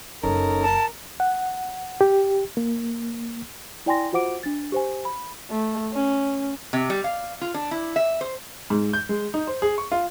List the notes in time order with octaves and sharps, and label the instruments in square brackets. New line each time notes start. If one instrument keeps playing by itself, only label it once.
[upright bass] F#1 F#3 [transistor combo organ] C#4 D#4 A4 [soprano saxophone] A#4
[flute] A5
[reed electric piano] F#5
G4
A#3
[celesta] E4 D5 G5 G#5 C6 A#6
F4 F#4 C5 F#5 D6 D7
D4 A6
G4 C5 G#5
B5
[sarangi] A3
C#4
[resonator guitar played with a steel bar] C3
G3
F5
F4
D4
E4
E5
C5
[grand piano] G#2
G6
G#3
D#4
C5
G#4
C#6
F4